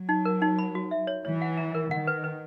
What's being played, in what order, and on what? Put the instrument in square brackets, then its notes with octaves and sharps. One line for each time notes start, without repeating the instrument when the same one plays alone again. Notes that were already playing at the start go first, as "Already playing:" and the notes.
Already playing: [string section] F#3
[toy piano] D#4
A#4
D#4
B5
F#4
E5
C#5
[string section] E3 [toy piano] C#5
[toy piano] F#5
A#5
A#4
[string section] D#3 [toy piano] F#5
[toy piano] B4
B4